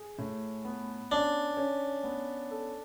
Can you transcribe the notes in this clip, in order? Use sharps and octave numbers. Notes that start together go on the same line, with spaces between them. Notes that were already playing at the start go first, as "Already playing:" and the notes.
Already playing: G#4
A2
B3
C#4 D4
C#4
B3
A4